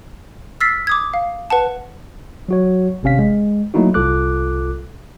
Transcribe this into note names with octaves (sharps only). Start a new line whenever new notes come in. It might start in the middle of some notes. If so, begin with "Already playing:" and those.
E6 F6 A6 B6 C7
D6 D#6 G#6
F5
B4 F#5 A5
F#3 F#4 C#5
G#1 C3 C#4 F5 B6
G#3
F#3 A3 A#3 D#4 E4 F#4
C2 F4 A4 D6 F#6